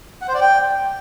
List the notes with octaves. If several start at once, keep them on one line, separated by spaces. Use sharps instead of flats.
F#5
C5
D5
G5